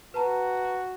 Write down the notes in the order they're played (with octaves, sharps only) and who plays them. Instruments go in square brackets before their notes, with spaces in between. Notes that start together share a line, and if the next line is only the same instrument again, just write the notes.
[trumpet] F#4 [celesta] B4 A5 A#5